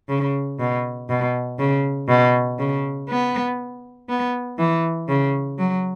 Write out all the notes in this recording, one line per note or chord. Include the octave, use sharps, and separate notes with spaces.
C#3
B2
B2
C#3
B2
C#3
B3
B3
E3
C#3
F#3